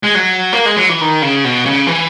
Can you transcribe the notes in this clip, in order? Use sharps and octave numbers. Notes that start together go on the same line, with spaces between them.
G#3
F#3
A#3
G#3
F#3
E3
D#3
C#3
B2
C#3
E3